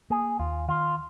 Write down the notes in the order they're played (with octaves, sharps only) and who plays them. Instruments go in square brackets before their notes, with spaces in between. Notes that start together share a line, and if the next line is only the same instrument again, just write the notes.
[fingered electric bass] A#3 [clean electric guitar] G#4
[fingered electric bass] D#2 [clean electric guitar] F4
[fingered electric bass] D#3 [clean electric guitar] F4